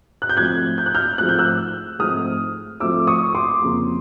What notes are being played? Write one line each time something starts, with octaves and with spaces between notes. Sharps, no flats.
F#6
G6
G#2 F3 A3 C4 F#6 G#6
G6
F#6
F6 G6
G#2 F3 A3 C4 F#6
G6
E6 F#6
G#2 F3 A3 C4 D#6 F6
G#2 F3 A3 C4 D6 E6
C#6 D#6
C6 D6
F2 C#3 F3 A#3